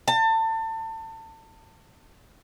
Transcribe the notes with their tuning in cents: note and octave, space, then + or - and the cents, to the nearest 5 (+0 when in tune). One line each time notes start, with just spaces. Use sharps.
A5 +30